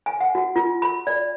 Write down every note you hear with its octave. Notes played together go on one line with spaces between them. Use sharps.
G#5
F#5
F#4
F4
B5
D5